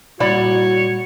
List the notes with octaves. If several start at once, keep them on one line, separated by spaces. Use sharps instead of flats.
A#2 G3 E4 F#4 C#5 D5 B5